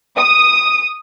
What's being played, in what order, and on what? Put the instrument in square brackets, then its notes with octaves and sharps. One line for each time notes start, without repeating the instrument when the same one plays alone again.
[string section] D#6